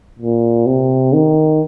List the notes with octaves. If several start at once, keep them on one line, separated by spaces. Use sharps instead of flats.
A#2
C3
D#3